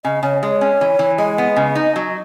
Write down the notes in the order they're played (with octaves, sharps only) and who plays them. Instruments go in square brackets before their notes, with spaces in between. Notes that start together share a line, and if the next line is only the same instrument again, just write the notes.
[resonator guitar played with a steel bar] C#3 [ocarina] D#5
[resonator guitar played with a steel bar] C#3 [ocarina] C#5
[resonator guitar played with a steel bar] G#3 [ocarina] C#5
[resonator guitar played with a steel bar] C#4
E3
E3
[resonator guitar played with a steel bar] G#3 [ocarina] D#5
[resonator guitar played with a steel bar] B3
C#3
D#4
F#3